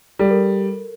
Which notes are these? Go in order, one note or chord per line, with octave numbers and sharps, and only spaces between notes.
G3 A4
A#4